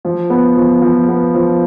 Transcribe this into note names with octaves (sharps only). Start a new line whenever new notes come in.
F3
B3
F3
F3
B3
F3